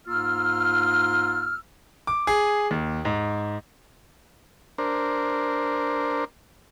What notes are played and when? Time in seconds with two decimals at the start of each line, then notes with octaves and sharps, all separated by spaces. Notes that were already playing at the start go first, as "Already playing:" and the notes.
0.07 G#2 A#3 F4 E6 F6
2.07 D6
2.27 G#4
2.71 D#2
3.05 G#2
4.78 D4 A#4 C5